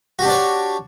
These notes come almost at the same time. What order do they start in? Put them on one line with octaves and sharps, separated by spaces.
F#4 G4 D4 D5 C#5